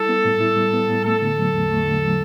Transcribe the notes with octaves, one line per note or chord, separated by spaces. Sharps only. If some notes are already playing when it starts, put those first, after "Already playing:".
Already playing: G3 E4 A4
B3
A2
E4
G3
B3
A2
A3 A4
D3
F#3
E2
A3
D3
F#3